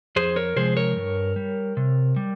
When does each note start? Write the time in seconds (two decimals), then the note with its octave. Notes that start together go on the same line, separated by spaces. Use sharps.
0.16 F2 G#4 C5
0.36 A#4 C#5
0.56 C3 F3 G#3 G#4 C5
0.77 A#4 C#5
0.97 G2
1.36 G3
1.77 C3
2.16 G3